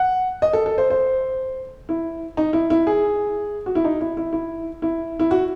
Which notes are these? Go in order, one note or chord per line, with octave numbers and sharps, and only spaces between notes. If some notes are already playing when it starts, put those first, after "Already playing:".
Already playing: F#5
D#5
A4
A4
C5
C5
E4
D#4
E4
E4
G#4
F#4
E4
D#4
E4
E4
E4
E4
E4
F#4